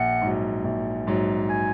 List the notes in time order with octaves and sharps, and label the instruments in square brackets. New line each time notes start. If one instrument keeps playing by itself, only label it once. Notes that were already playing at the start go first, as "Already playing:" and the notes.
Already playing: [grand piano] A#1 [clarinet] F#5
[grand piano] G#2 F#3
A#1
G#2 F#3
[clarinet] G#5